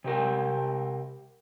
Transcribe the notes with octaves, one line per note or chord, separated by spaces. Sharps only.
C3 G4 A#4